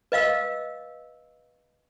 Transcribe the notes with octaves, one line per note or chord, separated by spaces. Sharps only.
B4 D#5 F5 E6